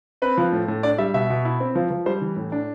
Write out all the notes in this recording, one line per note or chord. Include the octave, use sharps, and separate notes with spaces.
C4 B4
F3
A2
A2
D4 D5
G3 E5
B2 E5
B2
E4
C4
F3
F3
G3 C5
E3
A2
D4